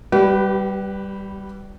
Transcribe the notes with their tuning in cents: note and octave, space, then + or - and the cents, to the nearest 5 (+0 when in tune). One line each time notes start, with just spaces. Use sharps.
G3 +0 G4 -40 B4 +0